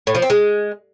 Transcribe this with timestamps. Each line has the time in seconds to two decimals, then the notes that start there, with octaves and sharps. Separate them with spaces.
0.07 A2
0.15 F3
0.22 C4
0.30 G#3